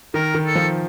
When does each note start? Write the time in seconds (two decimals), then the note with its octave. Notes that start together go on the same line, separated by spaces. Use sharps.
0.14 D#3 A#4
0.35 D#3
0.46 A4
0.55 F3